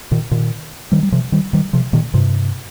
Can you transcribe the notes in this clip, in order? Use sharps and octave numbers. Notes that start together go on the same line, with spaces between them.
A#2 D#3
A#2 D#3
D#3 G3
G3
C3 F3
D#3 G3
D#3 G3
C3 F3
A#2 D#3
G2 C3